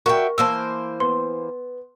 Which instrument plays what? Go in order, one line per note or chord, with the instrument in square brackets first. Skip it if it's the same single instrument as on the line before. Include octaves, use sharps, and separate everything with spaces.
[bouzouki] F#4 E5 G5 [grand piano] A#4 [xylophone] C#6
[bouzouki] E3 A#3 C5 [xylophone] A5 E6
[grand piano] B3 [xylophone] C6